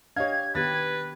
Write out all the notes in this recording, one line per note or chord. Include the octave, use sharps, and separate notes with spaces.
D4 G4 C#5 D#5 F5 G#6
D#3 B3 G4 B4 A6